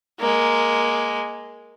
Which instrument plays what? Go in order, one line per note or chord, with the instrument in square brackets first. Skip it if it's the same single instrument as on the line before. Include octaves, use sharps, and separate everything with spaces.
[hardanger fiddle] G#3 A#3